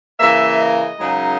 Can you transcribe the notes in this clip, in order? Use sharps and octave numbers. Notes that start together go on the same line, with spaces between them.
C#3 E3 A#3 E5
D#5
F#2 C#3 G#3 D#4